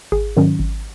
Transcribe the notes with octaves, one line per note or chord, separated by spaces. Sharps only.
G#1 G#4
G#2 D#3 F#3 C#4
G#1